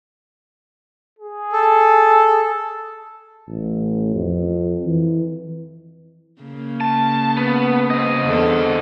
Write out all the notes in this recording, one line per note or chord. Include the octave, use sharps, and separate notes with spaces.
G#4
A4
A1
F2
E3
C#3 A#3
A5
B3
C4 D#5
E2 D3 A4